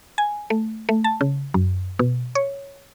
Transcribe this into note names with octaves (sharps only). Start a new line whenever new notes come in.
G#5
A3
A3
A5
C#3
F#2
B2
C#5